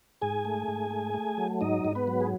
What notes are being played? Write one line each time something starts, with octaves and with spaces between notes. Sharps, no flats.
G#2 G#4 G#5
A3
G#2
A3
A3
F#3
G#2 D#4 D#5
G#2
B3 B4
F#3
G#4